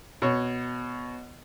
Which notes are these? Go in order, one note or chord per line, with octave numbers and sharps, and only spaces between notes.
B2 C#5